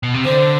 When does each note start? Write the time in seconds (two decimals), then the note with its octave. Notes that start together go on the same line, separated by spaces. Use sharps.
0.03 B2
0.14 C3
0.25 D3 C5